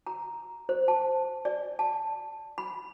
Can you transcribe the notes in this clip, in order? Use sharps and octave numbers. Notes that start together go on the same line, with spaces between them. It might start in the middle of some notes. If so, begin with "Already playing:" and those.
A#5
C5
A5
D5
A5
B5